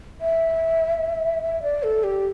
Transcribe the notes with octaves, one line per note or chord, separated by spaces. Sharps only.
E5
E5
D5
A4
G4